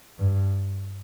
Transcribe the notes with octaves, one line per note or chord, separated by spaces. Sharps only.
G2